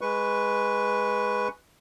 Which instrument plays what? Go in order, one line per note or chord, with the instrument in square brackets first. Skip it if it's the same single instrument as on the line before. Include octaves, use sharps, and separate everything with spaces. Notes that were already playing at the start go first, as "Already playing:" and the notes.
[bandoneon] G#3 B4 C#6